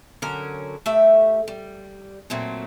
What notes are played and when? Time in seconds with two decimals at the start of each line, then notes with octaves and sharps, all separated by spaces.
0.22 D3 F#3 C#4 A#4
0.86 A3 G4 E5
1.48 G3
2.30 A#2 F#3 A3 C4